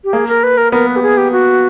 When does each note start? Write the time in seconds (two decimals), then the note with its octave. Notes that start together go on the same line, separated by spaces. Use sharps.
0.04 G4
0.13 A#3 G#4
0.28 A#4
0.43 B4
0.57 A#4
0.72 B3 A#4
0.87 B4
0.96 G4
1.02 G#4
1.17 G4
1.32 F#4